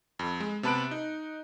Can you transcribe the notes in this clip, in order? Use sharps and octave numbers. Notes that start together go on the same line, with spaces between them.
F2
G#3
C3 B3 A5 B5 F#6 D7
D#4